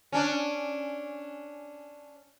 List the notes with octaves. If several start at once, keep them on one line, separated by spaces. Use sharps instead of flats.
C#4 D4